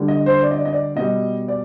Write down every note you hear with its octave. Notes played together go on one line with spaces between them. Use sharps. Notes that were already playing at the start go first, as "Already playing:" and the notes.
Already playing: D3 G3
D#5
C5
D5
D#5
D5
D#5
D5
B2 G3 D#5
D5